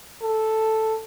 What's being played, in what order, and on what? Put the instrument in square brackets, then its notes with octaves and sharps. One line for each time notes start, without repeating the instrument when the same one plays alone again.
[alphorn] A4